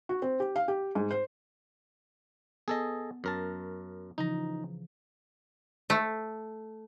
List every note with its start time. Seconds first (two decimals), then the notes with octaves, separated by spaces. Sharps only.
0.09 F#4
0.22 C4
0.40 G4
0.56 F5
0.68 G4
0.95 G#2
1.11 C5
2.68 B3 G#4 A4 D#5
3.24 F#2 A#4 A5
4.18 C#3 E3 F3 D#4 A#5
5.90 A3